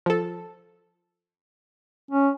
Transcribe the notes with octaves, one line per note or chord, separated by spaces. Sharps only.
F3 A4
C#4